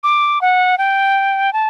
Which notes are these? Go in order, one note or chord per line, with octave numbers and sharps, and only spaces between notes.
D6
F#5
G5
A5